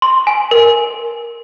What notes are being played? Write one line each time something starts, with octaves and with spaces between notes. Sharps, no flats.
C6
G#5
A#4